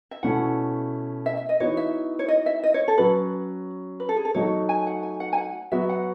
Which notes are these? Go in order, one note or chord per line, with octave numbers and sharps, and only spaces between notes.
E5
B2 A3 C#4 E4 F#5
E5
E5
D#5
E3 B3 D#4 F#4 C#5
E5
C#5
D#5
E5
D#5
C#5
A4
F#3 C#4 F#4 B4
B4
A4
G#4
A4
F#3 A3 D#4 F#4 C#5
G#5
F#5
G#5
F#5
G#5
F#5
F#3 B3 F#4 E5
F#5